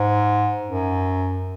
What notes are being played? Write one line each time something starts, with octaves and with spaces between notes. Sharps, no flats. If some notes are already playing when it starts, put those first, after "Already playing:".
Already playing: G#2
F#2